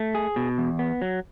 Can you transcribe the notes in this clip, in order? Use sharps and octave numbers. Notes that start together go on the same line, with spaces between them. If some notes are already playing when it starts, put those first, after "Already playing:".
Already playing: A3
G#4
B2
E2
B3
F#3